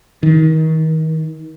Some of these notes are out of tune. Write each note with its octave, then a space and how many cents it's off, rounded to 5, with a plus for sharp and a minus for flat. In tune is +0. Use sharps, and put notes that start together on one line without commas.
D#3 +35